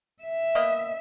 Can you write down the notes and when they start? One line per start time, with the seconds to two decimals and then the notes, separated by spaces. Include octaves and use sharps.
0.23 E5
0.55 B2 A#3 D#5